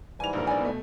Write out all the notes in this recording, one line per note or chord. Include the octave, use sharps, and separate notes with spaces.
G#2 E3 G3 G#5 F7
A#1 G2 A#4
D5 G#5
B2 A3